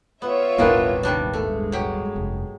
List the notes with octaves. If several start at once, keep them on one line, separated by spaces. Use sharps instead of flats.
B3 F4 C#5 E5
D#1 G#1 E3 G3 A#3 B3 D4
C2 D#3 G3 D4
G2 G#3 A3
F#3 G4
F1